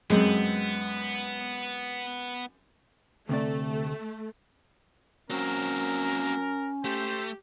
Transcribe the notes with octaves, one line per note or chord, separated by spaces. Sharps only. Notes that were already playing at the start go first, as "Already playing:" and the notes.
F#2 G#3 B3 C4
D2 C3 A3 D5
F#3 A#3 C4 C#4 A#4
A3 G4 C5